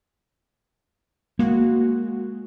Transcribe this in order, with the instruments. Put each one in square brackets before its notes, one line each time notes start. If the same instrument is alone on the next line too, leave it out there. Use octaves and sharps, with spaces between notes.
[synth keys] G#3 F#4 [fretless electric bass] A#3